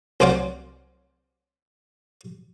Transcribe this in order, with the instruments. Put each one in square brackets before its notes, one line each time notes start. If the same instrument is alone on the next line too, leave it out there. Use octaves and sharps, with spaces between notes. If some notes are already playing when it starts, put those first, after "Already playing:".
[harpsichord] C2 F#3 C5 D5 F5 F#5